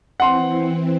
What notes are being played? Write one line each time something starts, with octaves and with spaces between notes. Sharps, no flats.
E3 C4 F#5 C6